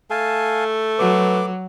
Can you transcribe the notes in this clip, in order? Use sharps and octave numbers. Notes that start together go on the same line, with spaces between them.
A3 F5 G#5 A5
F#3 B4 D6